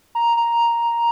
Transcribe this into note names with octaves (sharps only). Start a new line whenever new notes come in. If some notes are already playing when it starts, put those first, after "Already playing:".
A#5
A#5